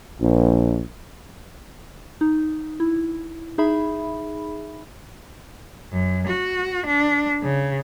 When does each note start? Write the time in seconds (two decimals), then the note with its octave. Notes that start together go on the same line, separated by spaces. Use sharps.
0.20 A#1
2.21 D#4
2.80 E4
3.58 D#4 G#4 E5 B5
5.91 F#2
6.27 F#4
6.86 D4
7.43 C#3